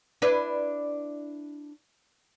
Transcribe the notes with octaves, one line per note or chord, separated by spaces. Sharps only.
D4 E4 B4